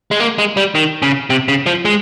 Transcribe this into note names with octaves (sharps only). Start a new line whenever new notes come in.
G#3
A#3
G#3
G3
D#3
C#3
C3
C#3
F3
G#3